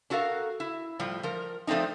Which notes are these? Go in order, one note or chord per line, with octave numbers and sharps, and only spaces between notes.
D4 F#4 A4 A#4 F5
E4
A2 F3 G3
F3 A#4
F3 A3 C4 D4 D#4